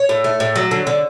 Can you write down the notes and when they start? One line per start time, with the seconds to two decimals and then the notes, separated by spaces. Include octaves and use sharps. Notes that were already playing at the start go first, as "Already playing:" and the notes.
Already playing: C#5
0.09 A2
0.24 A3
0.40 A2
0.56 F#3
0.71 D3
0.87 D3